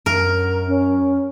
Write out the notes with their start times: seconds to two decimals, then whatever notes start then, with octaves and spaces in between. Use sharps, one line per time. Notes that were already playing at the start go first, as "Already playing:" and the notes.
0.06 F#2 A#4
0.68 C#4